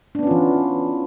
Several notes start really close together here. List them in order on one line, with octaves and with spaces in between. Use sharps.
D4 B3 C#4 F4 E3